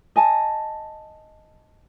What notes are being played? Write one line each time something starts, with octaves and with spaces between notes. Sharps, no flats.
D#5 G#5 A5